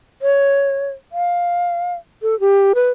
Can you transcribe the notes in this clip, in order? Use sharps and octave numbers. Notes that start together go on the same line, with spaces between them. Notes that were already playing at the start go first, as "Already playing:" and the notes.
C#5
F5
A4
G4
B4